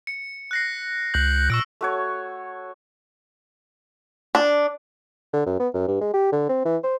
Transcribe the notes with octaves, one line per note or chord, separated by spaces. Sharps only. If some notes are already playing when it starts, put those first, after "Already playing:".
C#7
F#6 A#6 C7
C#2 F#6 G6 F#7
A#2 C#6 E6 D7
A3 F#4 C#5
D4
D3
F#2
B3
F#2
G2
G#3
G4
D3
C4
E3
C5